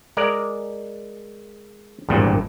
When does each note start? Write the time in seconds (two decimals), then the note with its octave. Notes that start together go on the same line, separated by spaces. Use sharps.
0.17 G#3 A#4 D5
2.09 G#1 E2 G2 A#2